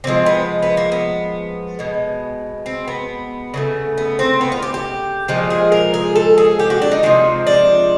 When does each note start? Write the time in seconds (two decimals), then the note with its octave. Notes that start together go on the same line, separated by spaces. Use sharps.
0.04 C3 F3 G#3 C4
0.26 B3
0.63 B3
0.77 A#3
0.92 B3
1.79 B2 G#3
2.66 C4
2.88 B3
3.54 C#3 F3 A3
3.98 B3
4.19 C4
4.41 B3
4.52 F4
4.62 G4
4.74 G4
5.28 A#2 F3 G#3 G4
5.50 G#4
5.72 A#4
5.94 G#4
6.16 A4
6.38 G#4
6.59 G4
6.70 F#4
6.82 D4
6.92 D#4
7.03 C3 F3 G#3
7.47 D4